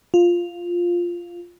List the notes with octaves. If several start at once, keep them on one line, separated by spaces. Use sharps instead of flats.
F4